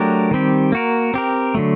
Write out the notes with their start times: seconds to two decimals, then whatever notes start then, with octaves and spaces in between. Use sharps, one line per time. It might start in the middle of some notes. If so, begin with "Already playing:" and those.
Already playing: F#3 A3 D4 G4 A#4
0.31 D#3 G3 C4 G4
0.72 A#3 F#4 A#4
1.14 C4 G4 A#4
1.55 D3 F#3 A3